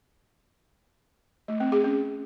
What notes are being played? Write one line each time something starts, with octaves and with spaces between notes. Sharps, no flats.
A3
C4
G#4
C#4